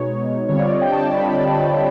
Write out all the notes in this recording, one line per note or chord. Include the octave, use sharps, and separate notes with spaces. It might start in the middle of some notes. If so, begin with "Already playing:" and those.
Already playing: B2 G#3 B3 D#4 C#5
D3 G3 C4 F4 C#5
D5
D#5
G5
A5
B5